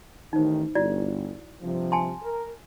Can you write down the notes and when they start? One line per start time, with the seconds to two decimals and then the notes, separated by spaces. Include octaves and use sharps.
0.33 A1 D#3 D#4 C5
0.75 G1 E4 F#4 D5
1.62 G2 C3 F3
1.92 G#5 A5 C6
2.22 A#4